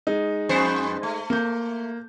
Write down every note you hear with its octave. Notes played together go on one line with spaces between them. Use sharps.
G#3 D#4
F2 B3 C5
A3
A#3 G6